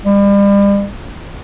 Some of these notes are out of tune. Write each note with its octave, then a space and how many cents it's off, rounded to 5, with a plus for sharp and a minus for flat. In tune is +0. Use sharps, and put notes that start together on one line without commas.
G3 +40